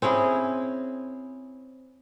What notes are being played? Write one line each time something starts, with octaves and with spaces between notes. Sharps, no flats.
C4 C#4 E4 G#4